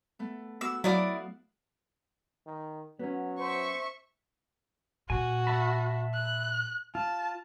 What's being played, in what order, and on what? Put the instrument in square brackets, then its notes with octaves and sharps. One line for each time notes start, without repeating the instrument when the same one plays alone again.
[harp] A3 B3
[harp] B3 F#4 [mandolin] E6
[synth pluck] F#3 [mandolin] E4 D5 D#6 [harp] F#4 F5 F#5
[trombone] D#3
[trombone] F#3 [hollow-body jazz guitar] B3 C#4
[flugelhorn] C5 [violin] E5 C#6
[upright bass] A#2 [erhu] F#4 [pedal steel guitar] G#5
[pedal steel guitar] E5 A5 B5
[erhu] F#6
[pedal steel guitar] F4 [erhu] A5